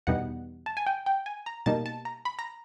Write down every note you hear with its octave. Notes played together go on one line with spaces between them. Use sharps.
E2 B2 G3 B3 D#4 F#5
A5
G#5
G5
G5
G#5
A#5
B2 G3 A#3 D#4 A5
A5
A#5
B5
A#5